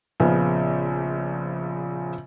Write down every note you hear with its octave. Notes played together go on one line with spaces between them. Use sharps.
A#1 C#3 F3 B3